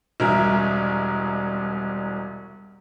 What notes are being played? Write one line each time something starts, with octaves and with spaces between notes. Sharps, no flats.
E1 C2 A#4 E5